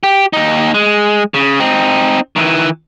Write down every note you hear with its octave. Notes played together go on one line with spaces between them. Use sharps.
G4
D#2 D#4
G#3
C#3
C4 D#4
D#3 E3